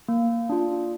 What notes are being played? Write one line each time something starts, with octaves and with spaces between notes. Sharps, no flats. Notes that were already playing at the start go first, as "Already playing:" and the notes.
A#3
D4 F4